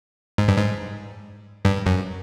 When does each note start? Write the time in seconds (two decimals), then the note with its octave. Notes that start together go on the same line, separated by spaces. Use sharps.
0.38 G#2
0.48 G2
0.58 G#2
1.65 G2
1.86 F#2